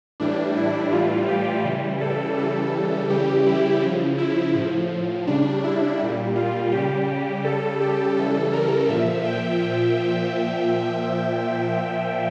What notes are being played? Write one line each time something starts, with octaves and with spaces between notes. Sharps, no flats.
A2 E3 G3 D4
E4
A2 E3 G3 F4
G4
C#3 E3 G3
A4
C#3 E3 G3 A4
C#3 E3 G3 G4
E4
C#3 F3
E4
A2 F3
C#3 G3 D4
E4
A#2 G3
F4
C#3 G3 G4
C#3 G3 A4
G4
C#3 E3 G3 A4
A#4
A#2 F3 E5
G5